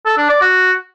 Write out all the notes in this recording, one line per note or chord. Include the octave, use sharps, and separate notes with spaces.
A4
D4
D5
F#4